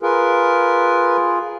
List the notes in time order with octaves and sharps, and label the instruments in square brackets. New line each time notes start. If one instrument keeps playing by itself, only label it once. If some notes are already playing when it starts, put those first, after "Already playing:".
[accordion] F4 G#4 [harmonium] A#4 B4